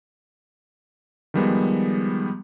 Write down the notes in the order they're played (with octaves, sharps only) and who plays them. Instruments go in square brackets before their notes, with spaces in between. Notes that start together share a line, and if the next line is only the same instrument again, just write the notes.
[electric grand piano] D#3 F3 G3 G#3 B3